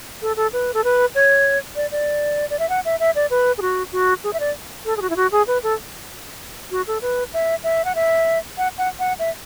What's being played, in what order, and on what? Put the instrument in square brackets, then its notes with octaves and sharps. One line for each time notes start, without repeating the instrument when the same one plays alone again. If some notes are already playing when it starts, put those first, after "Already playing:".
[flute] A4
A4
B4
A4
B4
C#5
D5
D5
D5
E5
F#5
E5
E5
D5
B4
G#4
F#4
F#4
G#4
E5
D5
A4
G#4
F#4
E4
F#4
G#4
B4
A4
F#4
A4
B4
E5
E5
F#5
E5
F#5
F#5
F#5
E5